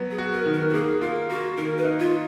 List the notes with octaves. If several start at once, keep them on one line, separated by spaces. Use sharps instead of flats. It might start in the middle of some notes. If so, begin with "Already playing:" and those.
Already playing: F#3 B3
G#4
F#4
A#4
D#3
A#4
F#4
A#3 G#4
F4 A#4
A#3 F#4
D#3 A#4
B4
D#4
F4